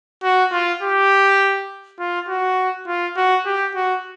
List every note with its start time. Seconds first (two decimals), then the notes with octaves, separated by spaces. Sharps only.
0.23 F#4
0.52 F4
0.82 G4
1.99 F4
2.28 F#4
2.87 F4
3.17 F#4
3.46 G4
3.75 F#4